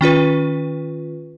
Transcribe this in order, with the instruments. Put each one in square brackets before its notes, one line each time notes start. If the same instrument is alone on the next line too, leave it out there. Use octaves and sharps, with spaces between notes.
[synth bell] D#3 C#4 F4 B4